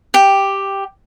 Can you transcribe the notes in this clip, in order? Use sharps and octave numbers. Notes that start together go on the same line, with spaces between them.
G4 G5